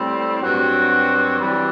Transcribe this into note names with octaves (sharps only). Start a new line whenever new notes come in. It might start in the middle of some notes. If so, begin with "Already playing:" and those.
Already playing: A2 G3 C4
G2 F#3 C4 F#4
E3 G3 C4 F#4